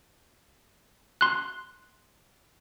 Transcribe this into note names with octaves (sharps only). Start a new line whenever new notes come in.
C6 F#6